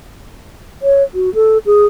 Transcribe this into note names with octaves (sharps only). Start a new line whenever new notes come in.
C#5
F#4
A4
G#4